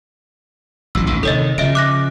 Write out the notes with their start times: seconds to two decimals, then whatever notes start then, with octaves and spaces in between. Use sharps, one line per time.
0.95 A1 F#3 E6
1.07 A1 D#3
1.23 C3 D#3 A4 C#5 D#5
1.58 C#3 F3 D#5 E5 D7
1.75 D6 F#6 A#6